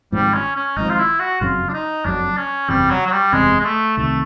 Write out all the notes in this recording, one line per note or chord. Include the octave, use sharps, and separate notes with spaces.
G#1 G#2 F3 G3
C#4
C#4
G#1 G#2 F3 D#4
F4
E4
F#4
F#1 F2 C#3 F#3 F4
D4
D#4
F#1 F2 C#3 F#3 D4
C#4
F#1 E2 C3 G3
F#3
F#3
G3
F#1 E2 C3 G#3
G#3
A3
C2 C3 D#3 A3